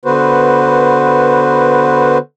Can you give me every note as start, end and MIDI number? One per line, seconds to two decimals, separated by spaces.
0.05 2.18 50
0.05 2.18 59
0.05 2.18 66
0.05 2.18 71
0.05 2.18 72